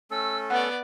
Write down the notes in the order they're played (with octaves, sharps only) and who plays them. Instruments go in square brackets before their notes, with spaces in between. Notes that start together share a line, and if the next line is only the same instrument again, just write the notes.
[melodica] A3 C#4 A4 [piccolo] E6
[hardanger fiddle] B3 D5 [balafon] F#5 [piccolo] F#6